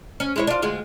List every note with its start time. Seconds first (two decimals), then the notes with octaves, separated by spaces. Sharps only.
0.20 C#4
0.36 G#3 E4 C#5
0.47 D4 F4
0.62 D2 G#3 F4